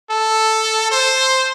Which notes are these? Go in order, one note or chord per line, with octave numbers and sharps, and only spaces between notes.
A4
C5